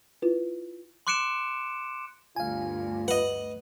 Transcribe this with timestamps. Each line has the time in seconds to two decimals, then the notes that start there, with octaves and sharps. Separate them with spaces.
0.22 E4 F4 B4
1.07 C6 D6 F#6 C#7 D7 E7
2.36 G1 D2 G2 F4 F5 G#5
3.08 B4 D#5 F#5